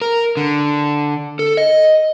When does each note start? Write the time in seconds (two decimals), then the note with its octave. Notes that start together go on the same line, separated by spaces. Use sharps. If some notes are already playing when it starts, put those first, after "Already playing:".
0.01 A#4
0.37 D3
1.39 A4
1.57 D#5